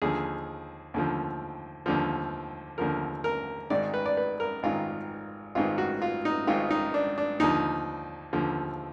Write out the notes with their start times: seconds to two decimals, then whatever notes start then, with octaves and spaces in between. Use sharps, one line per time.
0.02 D#2 D3 F3 G#4
0.94 D#2 D3 F3
1.86 D#2 D3 F3
2.78 D#2 D3 F3 A#4
3.24 A#4
3.70 G#1 G#2 D#3 D5
3.94 B4
4.06 D5
4.17 B4
4.40 A#4
4.63 G#1 G#2 D#3 F4
5.55 G#1 G#2 D#3 F4
5.78 F#4
6.02 F4
6.25 D#4
6.47 G#1 G#2 D#3 F4
6.71 D#4
6.94 D4
7.18 D4
7.40 D#2 D3 F3 D#4
8.33 D#2 D3 F3